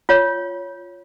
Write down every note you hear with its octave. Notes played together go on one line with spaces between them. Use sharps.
F4 C#5